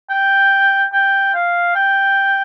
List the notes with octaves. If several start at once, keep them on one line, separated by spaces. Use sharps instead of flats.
G5
G5
F5
G5